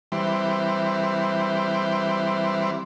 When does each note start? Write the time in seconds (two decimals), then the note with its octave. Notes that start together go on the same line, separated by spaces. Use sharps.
0.12 E3 G3 C4